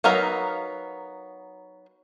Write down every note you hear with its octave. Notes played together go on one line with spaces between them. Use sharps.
F#3 B3 D#4 A#4 F5